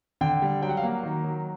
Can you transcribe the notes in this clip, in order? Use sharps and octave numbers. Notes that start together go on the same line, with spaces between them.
D3 G5
G3
F#3 G5
F#5
F5
A#3 F#5
D#3
F#3